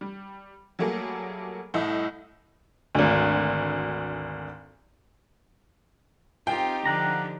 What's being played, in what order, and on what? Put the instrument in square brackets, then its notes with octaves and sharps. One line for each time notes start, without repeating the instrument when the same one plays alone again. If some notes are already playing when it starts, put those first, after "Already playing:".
[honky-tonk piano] G3
F#3 G3 A3 A#3 G#4
C2 A2 D#5 E5
G#1 D2
[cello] C4 F4 [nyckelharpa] D#4 G4 [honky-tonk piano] G5
[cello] D3 F3 [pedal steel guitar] F5 F#5 A#5